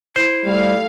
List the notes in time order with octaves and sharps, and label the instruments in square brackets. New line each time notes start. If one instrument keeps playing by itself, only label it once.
[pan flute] E4 [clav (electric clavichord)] C5
[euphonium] G3 [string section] A3 F5